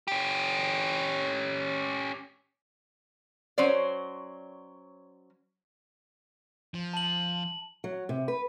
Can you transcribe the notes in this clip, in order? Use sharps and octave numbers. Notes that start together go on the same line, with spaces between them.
C#4 G4
F#3 C#4 C5 D5
F3
A5 F#7
F#3
C3
B4